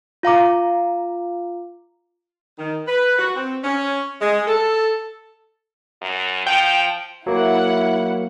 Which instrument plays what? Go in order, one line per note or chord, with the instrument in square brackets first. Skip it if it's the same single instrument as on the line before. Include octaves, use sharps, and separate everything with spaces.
[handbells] F4 F5 A#5 D6
[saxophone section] D#3
B4
F#4
C4
C#4
G#3
A4
[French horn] F#2
[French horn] F3 [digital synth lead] G5
[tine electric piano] F#3 A#3 [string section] E4 F#5